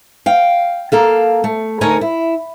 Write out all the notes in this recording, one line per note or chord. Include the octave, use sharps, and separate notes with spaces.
F5 G5
A#3 A4 F5
A3
D2 A3 D#4 A#4 C#5 G#5
E4